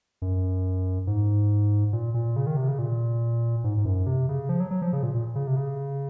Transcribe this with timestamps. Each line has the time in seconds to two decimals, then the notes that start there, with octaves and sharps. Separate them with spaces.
0.22 F#2
1.07 G#2
1.93 A#2
2.14 A#2
2.36 C#3
2.47 D#3
2.57 C3
2.68 C#3
2.79 A#2
3.64 G#2
3.77 G#2
3.85 F#2
4.07 C3
4.29 C#3
4.49 F3
4.60 F#3
4.71 F#3
4.82 F3
4.93 C#3
5.03 A#2
5.14 A#2
5.35 C#3
5.47 C3
5.57 C#3